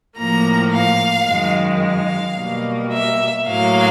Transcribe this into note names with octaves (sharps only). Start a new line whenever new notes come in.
A2 F3 A#3 A#5
F5
F#2 D#3 G#3
F5
B2 G3 A#3
E5
A2 F#3 A#3 F5